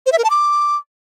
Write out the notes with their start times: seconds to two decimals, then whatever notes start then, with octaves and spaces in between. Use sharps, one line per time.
0.06 C5
0.12 E5
0.18 A#4
0.24 A5
0.30 D6